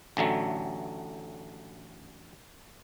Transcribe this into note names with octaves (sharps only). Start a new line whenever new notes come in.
A1 D3 F#3 A3